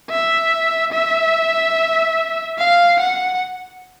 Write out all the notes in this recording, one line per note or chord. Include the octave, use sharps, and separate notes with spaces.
E5
E5
F5
F#5